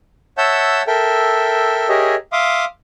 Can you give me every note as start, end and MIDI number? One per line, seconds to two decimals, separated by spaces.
0.38 0.82 73
0.38 0.82 76
0.38 0.82 78
0.38 0.82 81
0.38 0.82 88
0.38 0.82 91
0.87 1.89 69
0.87 1.89 70
0.87 1.89 76
0.87 1.89 79
1.89 2.15 67
1.89 2.15 68
1.89 2.15 70
1.89 2.15 73
1.89 2.15 75
1.89 2.15 76
2.33 2.65 76
2.33 2.65 77
2.33 2.65 84
2.33 2.65 86
2.33 2.65 87